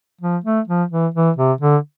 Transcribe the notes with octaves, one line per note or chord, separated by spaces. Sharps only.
F3
A3
F3
E3
E3
C3
D3